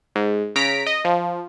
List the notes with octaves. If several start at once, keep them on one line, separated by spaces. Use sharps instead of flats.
G#2
C#3 A#5 B6 D7
D#5
F3